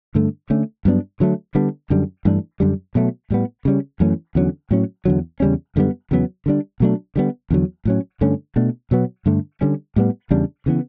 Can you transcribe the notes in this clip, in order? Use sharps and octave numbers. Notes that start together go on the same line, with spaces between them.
G2 D3 A3
D3 A3 C#4
G2 F#3 B3 D4
D3 F#3 A3
D3 G3 B3 D4
F#2 D3 G3
G2 E3 A3 D4
F#2 D3 G3
B2 F#3 A3
A2 G3 B3
C#3 G3 C#4
F#2 E3 A3 C#4
E2 D3 F#3 C#4
A2 F#3 C#4
E2 D3 F#3
E2 C#3 G3 C#4
F#2 D3 G3 B3
E2 C#3 F#3 B3
D3 G3 D4
B2 F#3 A3 D4
D3 G3 B3
E2 D3 F#3
A2 F#3 C#4
G2 D3 A3 C#4
B2 A3 D4
B2 F#3 B3
G2 D3 A3
D3 G3 C#4
A2 G3 B3
E2 C#3 G3 D4
C#3 E3 B3